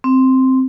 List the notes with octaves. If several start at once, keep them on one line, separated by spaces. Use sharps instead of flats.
C4